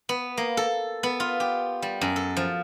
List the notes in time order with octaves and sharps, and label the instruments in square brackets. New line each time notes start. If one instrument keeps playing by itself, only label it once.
[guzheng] B3
A#3
A4
B3
F4
G4
G3
F#2
A4
F3